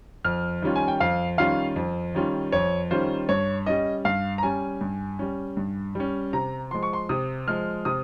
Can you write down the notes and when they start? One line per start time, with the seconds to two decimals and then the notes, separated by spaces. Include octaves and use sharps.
0.25 F2 F6
0.62 D#3 G3 C#4 F4
0.76 G#5
0.88 G5
1.00 F2 F5
1.38 D#3 G3 C#4 F4 F5
1.76 F2
2.15 D#3 G3 C#4 F4
2.52 F2 C#5
2.91 D#3 G3 C#4 F4 C5
3.29 G2 C#5
3.66 G3 C#4 D#5
4.05 G2 F5
4.38 A#5
4.43 G3 C#4 G#5
4.81 G2
5.19 G3 C#4
5.57 G2
5.95 G3 C#4
6.33 C3 A#5
6.71 F3 G#3 C6
6.83 C#6
6.93 C6
7.09 C3 D#6
7.47 F3 G#3 F6
7.85 C3 D#6